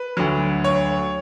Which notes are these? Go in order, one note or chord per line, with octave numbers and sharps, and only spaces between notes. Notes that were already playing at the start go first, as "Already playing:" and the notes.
Already playing: B4
D2 D3 F#3
C#5